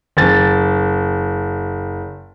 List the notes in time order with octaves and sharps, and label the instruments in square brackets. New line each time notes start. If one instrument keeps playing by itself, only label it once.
[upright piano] F#1 A6